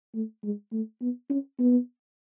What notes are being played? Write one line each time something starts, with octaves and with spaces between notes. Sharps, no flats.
A3
G#3
A3
B3
C#4
B3